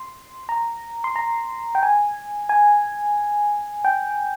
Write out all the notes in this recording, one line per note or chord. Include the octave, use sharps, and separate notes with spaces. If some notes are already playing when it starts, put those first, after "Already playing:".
Already playing: C6
A#5
C6
A#5
G5
G#5
G#5
G5